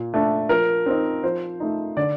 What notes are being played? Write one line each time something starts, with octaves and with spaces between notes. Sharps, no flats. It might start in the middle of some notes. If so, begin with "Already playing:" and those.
Already playing: A#2
A3 D4
F3 A#4
C4 D#4
F3 C5
A3 D#4
D3 D5